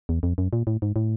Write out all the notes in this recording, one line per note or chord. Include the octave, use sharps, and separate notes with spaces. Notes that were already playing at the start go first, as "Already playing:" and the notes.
E2
F2
F#2
A#2
A2
G#2
A2